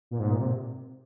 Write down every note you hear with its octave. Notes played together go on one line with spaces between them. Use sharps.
A#2
G#2
A#2
C3